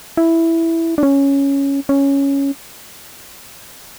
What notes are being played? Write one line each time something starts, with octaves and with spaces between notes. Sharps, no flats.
E4
D4
C#4
C#4